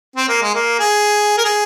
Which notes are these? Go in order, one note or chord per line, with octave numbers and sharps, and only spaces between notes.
C4
A#3
G#3
A#3
G#4
A#4
G#4